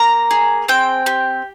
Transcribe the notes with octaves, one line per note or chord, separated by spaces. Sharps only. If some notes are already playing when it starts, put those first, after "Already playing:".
Already playing: A#3 A#5
G#4
C4 G5
G4